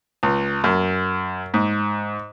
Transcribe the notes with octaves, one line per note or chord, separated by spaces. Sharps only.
C#2
F#2
G#2